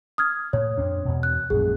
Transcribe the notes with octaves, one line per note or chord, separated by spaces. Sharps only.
D#6 F6 G#6
A2 C#5
F2 C4 D4
E2 B2
F#6
A#1 F#2 G#3 G#4